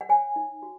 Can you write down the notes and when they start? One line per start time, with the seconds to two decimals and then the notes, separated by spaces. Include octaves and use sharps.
0.01 F#5
0.09 C#5 G#5
0.36 D#4
0.63 F#4